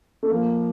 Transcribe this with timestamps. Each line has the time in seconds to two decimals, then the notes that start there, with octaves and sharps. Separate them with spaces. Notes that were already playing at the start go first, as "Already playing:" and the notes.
0.23 A3
0.30 F3 A#3